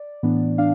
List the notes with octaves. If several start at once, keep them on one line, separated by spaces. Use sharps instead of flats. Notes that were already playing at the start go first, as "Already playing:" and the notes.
Already playing: D5
A2 E3 B3 D4
D4 F5